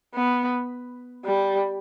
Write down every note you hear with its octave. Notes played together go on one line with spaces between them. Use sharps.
B3
G3